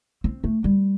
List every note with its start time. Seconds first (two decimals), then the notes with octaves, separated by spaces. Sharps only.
0.24 C4
0.44 A3
0.64 G3